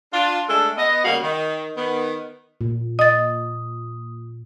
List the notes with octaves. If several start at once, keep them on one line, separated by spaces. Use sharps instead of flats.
D4 F4
G#3 A3 D4 A4
B3 D#5
C#3 G3 A#3 F#4 F5
D#3
D#3 B3
A#2
D#5 D#6 A6